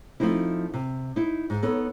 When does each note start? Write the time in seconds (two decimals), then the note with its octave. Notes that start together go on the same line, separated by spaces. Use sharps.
0.20 F3 A3 C4 D#4 E4
0.74 C3
1.16 D#4 E4
1.50 G#2
1.63 B3 D#4 A4 C#5